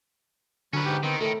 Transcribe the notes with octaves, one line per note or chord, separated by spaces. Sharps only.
D3 F#3 C#4 B4
G#2 G4
D#3 B3 C4
A2 D#3 A3